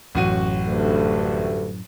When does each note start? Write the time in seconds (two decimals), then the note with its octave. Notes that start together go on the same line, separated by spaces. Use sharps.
0.15 A1 F#2 A2 F#4 D#7
0.67 D2 G2 A3